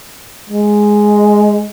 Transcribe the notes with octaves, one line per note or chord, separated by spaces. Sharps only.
G#3